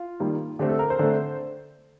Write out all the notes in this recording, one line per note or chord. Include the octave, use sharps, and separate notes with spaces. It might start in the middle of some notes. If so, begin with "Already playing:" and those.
Already playing: F4
D#3 G3 A#3
D3 A3 C4 G4
A4
A#4
C5
D3 A3 C4